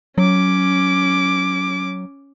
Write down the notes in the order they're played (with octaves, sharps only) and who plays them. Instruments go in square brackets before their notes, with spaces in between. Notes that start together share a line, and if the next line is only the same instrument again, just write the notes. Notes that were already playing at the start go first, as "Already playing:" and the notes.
[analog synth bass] F#3 [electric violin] C#4 D6